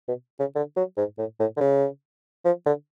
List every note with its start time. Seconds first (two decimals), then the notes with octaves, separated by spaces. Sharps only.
0.08 B2
0.40 C#3
0.55 D3
0.76 F#3
0.97 G#2
1.18 A2
1.39 A2
1.57 D3
1.61 C#3
2.45 F3
2.66 D3